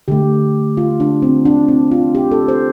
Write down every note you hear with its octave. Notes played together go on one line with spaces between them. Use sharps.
D3 A3 G4
F4
D4
C4
D4
C4
F4
G4
A4
C5